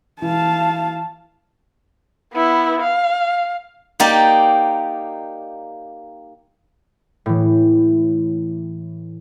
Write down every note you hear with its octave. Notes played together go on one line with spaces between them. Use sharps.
E3 F5 A5
B3 E4
F5
A#3 D#4 G4 D5
A2 E3